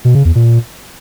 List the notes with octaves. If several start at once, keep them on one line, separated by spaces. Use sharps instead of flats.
B2
C#3
E2
A#2